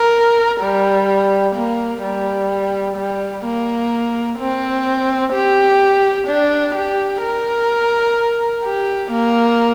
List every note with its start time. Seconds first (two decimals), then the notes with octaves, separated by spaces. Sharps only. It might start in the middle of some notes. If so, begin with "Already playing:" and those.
Already playing: A#4
0.61 G3
1.56 A#3
2.02 G3
2.97 G3
3.44 A#3
4.39 C4
5.33 G4
6.27 D4
6.75 G4
7.23 A#4
8.64 G4
9.11 A#3